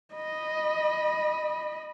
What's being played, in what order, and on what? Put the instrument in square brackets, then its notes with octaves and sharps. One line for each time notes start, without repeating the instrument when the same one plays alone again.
[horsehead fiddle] D#5 B5